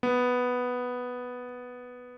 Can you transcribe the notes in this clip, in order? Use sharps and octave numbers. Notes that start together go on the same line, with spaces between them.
B3